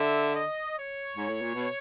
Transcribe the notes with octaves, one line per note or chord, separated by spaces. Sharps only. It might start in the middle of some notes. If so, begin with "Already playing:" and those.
Already playing: D3 E5
D#5
C#5
G#2
A2
A#2
B2